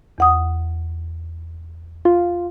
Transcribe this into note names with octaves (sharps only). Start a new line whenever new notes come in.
E2 F#5 D#6
F4